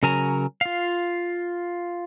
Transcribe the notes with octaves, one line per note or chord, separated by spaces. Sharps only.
C#3 F#3 A#4 G#5 A#5
F4 F5